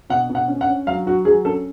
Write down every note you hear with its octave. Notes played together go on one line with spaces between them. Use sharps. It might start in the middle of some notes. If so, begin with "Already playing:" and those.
B2 F#5
B2
F#5
C#4
F#5
C#4
F#3 F5
F#3 F#4
F#3 G#4
C#4 A4